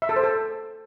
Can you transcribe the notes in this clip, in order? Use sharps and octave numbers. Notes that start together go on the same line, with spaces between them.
E5
A4
C5
A4